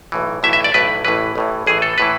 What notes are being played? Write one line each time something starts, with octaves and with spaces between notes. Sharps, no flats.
B1 A2 E3
B1 A2 E3 E5
E5
D5
B1 A2 E3 B4
A1 A2 E3 B4
A1 A2 E3
A1 A2 E3 G#4
A4
A2 E3 B4